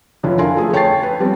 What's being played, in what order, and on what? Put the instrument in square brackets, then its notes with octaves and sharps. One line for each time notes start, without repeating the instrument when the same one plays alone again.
[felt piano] F1 D3 C#4 E4 F4
A4 A#4 F5 G#5 C6
F3 A3 G#4 A4
C#5 G5 A5 C#6 A6 C7
B4
G3 B3 C4